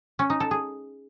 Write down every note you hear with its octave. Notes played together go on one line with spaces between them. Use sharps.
C#4
D#4
A4
G#4